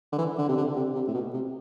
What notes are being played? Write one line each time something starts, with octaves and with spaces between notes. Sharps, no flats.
D3
E3
D3
C3
D3
C3
C3
A2
B2
C3